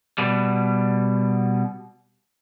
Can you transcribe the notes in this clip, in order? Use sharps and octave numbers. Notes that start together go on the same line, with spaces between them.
B2 G3